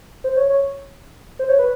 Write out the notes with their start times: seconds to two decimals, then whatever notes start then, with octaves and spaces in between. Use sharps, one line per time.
0.24 C5
0.37 C#5
0.50 C#5
1.39 C5
1.49 C#5
1.59 B4